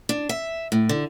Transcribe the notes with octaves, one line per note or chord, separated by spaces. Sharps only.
D4
E5
A2
D3